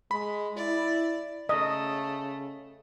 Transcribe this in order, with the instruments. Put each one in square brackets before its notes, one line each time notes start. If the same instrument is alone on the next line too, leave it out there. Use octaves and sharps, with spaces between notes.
[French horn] G#3 [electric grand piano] B5
[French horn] E4 [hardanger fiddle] D5
[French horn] C#3 [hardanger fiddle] A3 [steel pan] D#5